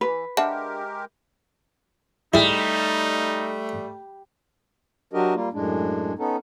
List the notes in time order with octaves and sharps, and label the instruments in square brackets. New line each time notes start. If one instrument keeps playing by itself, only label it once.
[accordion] E3 [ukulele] B4
[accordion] G#3 G4 A#4 [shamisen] D4 F#5 A5 [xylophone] E5
[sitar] G3 [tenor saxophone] A3 [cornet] D#4 [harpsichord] E4 G#4
[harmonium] F#3 D4 F#4 G4 A#4 D#5
G3 A#3 F4
F#2 A2 G#3 D4
B3 C#4 D#4 A4